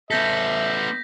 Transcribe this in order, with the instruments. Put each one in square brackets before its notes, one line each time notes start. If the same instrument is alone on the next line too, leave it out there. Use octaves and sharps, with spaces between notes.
[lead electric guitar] B3 A4 [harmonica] E5 [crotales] G6 A#6 B6